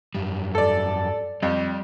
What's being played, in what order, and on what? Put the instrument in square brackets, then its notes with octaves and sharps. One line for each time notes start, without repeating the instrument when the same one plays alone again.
[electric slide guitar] F#2 G3
[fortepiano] A4 D5
[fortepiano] F2 [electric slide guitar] G3